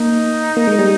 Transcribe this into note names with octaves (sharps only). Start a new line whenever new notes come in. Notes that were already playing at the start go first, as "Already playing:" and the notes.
Already playing: A#3 D#4
A#3
G#3
G3